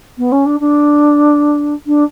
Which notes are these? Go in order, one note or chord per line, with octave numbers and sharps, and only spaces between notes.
B3
C#4
D4
D4
D4